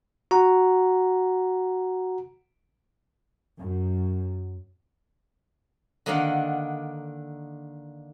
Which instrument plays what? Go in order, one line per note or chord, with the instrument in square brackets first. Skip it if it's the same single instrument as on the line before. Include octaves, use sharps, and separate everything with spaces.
[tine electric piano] F#4 F#5 A#5
[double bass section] F#2
[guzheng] D3 D#3 A#3 D4 F5 F#5